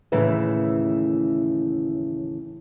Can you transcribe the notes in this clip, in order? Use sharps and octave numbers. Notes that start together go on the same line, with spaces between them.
D#2 A2 C#3 E3 E5